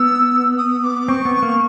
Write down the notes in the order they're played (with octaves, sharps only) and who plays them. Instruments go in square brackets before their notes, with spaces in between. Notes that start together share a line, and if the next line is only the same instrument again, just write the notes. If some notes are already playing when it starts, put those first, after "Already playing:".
Already playing: [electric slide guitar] B3 [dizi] E6
[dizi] D#6
D6
[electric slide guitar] C4 [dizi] C#6
[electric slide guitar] B3
A#3